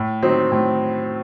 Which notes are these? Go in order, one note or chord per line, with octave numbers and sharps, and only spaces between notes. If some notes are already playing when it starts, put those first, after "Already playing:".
Already playing: A2
F#3 C4 D#4
A2